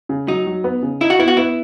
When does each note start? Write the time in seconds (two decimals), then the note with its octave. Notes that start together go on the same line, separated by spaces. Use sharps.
0.09 C#3
0.28 F#3 D#4
0.47 F#3
0.64 B3
0.83 C#3
1.01 D#4 E4
1.10 F#4
1.19 B3 E4
1.28 F#4
1.37 B3 E4